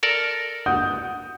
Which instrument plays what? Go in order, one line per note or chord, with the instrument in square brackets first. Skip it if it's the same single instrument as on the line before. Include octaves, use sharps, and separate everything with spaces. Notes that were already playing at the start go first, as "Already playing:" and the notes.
[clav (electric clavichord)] A4 A#4 D5
[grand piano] F#5 D#6 G6